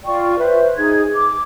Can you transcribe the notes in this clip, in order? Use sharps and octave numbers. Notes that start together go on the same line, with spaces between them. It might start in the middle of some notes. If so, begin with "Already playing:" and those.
F4 D5 G5 C#6
B4 C5 E5
D#4 G#4 G#6
D6